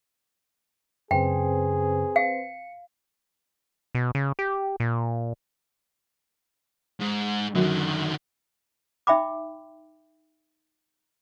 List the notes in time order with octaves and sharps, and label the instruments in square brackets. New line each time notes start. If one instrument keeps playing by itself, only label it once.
[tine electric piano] F#2 C#3 [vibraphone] C4 B4 C5 [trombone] G#4 [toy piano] G5
[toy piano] F5 [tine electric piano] C#7
[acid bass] B2
C#3
G4
A#2
[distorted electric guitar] G#2
[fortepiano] F#2 F#3 [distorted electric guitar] D3 D#3
[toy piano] D#4 E5 G5 B5 D6